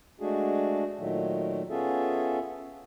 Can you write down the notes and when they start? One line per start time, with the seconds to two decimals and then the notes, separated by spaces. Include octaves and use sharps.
0.20 G#3 A3 D4 F#4 G#4
0.99 A#2 D#3 F#3 A3
1.70 B3 C#4 F4 G#4 A4 E5